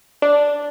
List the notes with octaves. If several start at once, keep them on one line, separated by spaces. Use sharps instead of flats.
D4